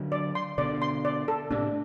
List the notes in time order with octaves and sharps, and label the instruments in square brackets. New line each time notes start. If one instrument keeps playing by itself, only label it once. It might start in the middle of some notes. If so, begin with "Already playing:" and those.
Already playing: [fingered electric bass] D3 F#3
[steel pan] D5
C6
[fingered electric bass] B2 D3 [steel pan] D5
[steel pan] C6
D5
A4
[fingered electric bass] A2 C3 [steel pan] D4